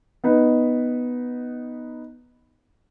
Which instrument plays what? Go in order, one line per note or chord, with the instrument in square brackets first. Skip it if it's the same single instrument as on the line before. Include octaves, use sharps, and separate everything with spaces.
[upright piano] B3 D#4 B4